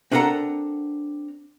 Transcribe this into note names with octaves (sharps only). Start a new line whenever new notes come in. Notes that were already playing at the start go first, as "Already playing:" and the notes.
C4 D4 A4 A#4 F#5 A#5